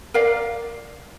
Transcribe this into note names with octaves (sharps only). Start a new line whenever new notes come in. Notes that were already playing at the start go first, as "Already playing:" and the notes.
A#4 D5 F5